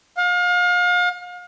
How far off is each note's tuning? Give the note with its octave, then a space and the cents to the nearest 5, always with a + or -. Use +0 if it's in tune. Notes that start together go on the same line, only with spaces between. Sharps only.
F5 +35